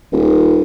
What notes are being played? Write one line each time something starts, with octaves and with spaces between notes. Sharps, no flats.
D#1